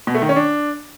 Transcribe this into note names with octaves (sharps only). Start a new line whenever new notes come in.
B2
A3
D#3
C#4
D4